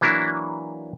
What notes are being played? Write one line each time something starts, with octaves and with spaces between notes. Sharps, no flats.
E3 F#3 A#3 D4 E4